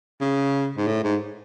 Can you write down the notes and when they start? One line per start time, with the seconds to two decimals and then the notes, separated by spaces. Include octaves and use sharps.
0.21 C#3
0.77 G#2
0.87 A2
1.04 G#2